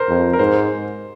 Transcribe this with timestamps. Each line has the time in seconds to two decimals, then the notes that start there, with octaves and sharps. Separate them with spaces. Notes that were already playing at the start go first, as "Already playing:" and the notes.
Already playing: A#4 C5
0.08 F2
0.33 A#4
0.39 G#2 C5